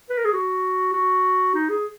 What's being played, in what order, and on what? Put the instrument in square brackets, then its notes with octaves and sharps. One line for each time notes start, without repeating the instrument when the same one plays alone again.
[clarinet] B4
A#4
G#4
F#4
F#4
D#4
G#4